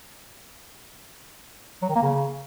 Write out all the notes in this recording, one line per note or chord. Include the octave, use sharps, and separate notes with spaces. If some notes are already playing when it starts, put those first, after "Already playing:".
F#3
D#3
A#3
C#3